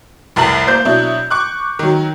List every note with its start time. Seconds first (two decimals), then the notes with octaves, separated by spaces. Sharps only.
0.36 F1 C2 A5 A#5 F#7
0.67 A#3 C5 G6
0.85 B2 F#3 D4 E4
1.31 C#6 D6 F#6
1.79 D#3 F#3